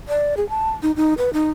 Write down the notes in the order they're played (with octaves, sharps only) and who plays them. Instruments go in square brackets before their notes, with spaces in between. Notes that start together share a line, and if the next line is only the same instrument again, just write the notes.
[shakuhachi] D5
G#4
A5
D#4
D#4
B4
D#4